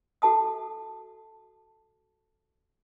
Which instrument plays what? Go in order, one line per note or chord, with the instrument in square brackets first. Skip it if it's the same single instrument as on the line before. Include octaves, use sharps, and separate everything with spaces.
[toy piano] F#4 A4 A5 D#6